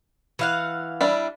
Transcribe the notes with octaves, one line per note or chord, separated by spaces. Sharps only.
E3 F5 F#5
G3 D4 E4